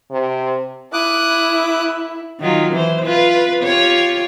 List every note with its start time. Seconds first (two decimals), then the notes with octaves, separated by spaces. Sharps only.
0.11 C3
0.93 E4 D6 D#6 F#6
2.40 D#3 F#3 F4
2.72 E3 C5
3.04 F4 B4
3.63 F4 G4 C#5